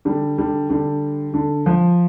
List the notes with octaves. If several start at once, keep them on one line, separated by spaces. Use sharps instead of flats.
D3 G3
D3 G3
D3 G3
D3
F3